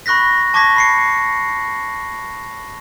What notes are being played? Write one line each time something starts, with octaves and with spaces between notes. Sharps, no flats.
B5 C#6 F#6 A#6 B6
A5 C#6 D6 G#6 A#6 B6
B5 C7 C#7